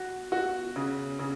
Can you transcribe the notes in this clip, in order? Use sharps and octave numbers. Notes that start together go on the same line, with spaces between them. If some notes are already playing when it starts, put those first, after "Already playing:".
Already playing: F#4
F#4
C#3
C#3